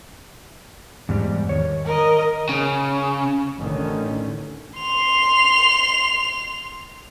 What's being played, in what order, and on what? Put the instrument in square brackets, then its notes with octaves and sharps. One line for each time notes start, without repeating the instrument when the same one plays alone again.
[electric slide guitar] E2 G#2 G3
D#3 C#5
[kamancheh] A#4 D#5
[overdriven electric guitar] C#3
[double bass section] A1 D3 D#3 C#4
[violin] C6 F7